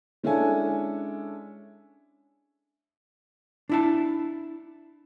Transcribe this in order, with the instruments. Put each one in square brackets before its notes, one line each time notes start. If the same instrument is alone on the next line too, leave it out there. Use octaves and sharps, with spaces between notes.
[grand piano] G#3 C#4 D4 E4 A4 G#5
[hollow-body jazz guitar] D4 E4 A5